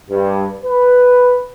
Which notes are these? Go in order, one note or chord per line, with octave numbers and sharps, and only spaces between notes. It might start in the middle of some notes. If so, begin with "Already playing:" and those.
G2
B4